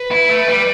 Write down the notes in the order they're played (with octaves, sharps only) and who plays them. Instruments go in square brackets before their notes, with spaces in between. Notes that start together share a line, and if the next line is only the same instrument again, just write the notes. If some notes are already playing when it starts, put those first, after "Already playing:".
Already playing: [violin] B4
[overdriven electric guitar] E4
A3
G3